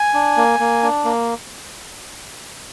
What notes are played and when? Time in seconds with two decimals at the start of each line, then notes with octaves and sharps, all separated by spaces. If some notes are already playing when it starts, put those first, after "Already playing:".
Already playing: G#5
0.14 D4
0.37 A#3
0.60 A#3
0.83 D4
1.05 A#3